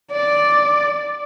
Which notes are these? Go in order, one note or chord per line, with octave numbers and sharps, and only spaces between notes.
D5